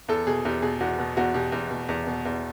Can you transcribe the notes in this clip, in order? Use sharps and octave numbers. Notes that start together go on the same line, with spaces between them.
E2 A4
B2 G#4
E2 G4
B2 G#4
E2 F#4
B2
E2 F#4
B2 G4
E2
B2
E2
B2
E2